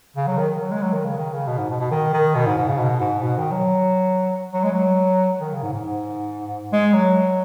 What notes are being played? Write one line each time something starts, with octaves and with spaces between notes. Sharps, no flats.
C#3
F#3
D#3
F#3
G#3
F#3
D#3
C#3
D#3
C#3
B2
G#2
B2
B2
D#3
D#3
B2
G#2
G#2
C#3
B2
G#2
B2
D#3
F#3
F#3
G#3
F#3
D#3
C#3
G#2
G#2
G#2
G#3
F#3